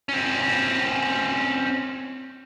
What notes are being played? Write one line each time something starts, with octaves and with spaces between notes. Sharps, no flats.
C4 C#4